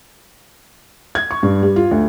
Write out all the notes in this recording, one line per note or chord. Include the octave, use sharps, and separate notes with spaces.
G#6
C#6
G2
G3
F4
D2